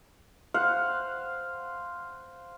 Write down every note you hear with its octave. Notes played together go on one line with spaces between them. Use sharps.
C5 F5 F#5